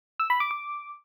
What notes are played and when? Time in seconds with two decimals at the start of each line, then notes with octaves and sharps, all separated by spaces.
0.20 E6
0.30 B5
0.40 D6
0.51 D6